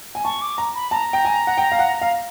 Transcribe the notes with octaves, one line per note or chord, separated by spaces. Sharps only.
G#5
A5 C#6
D6
A#5
B5
A5 A#5
G5
G#5
F#5
G5
F5
F#5
F5